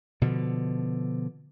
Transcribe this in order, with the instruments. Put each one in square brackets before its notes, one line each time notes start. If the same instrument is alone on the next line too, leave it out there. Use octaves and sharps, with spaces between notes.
[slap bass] B2 D3 F3